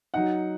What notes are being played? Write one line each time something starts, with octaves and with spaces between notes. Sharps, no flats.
F#3 D#4 F#5